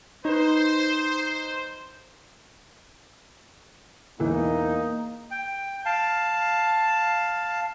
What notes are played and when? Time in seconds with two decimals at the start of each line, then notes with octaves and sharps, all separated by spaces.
0.25 D#4 B4 C5
4.20 E1 E3 A#3 D#4
5.31 G5
5.86 F5 A5